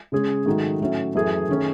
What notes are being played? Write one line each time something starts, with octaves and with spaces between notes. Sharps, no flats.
C#3 G#3 C#4 G#4
G#2 D#3 F#3 A3 D#4
A2 F#3 C#4 E4
F#2 E3 A3 E4 G#4
D#3 A3 C#4 G#4